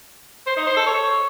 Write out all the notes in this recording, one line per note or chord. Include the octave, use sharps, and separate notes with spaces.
C5
D#4
C5
A4
C#5